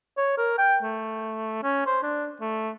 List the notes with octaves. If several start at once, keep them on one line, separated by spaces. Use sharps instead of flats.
C#5
A#4
G5
A3
C#4
C5
D4
A3